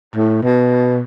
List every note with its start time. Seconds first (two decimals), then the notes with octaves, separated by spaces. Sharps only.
0.16 A2
0.43 B2